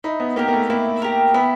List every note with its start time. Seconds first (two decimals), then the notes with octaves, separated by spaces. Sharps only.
0.04 D#4 E4
0.20 B3
0.36 A#3 G4 A#4
0.48 A#3
0.53 A3
0.70 A#3 E4
1.02 G4 A#4
1.34 B3 E4